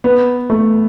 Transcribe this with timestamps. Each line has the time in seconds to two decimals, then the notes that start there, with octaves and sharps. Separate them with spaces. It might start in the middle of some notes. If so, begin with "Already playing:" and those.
0.04 B3
0.50 A3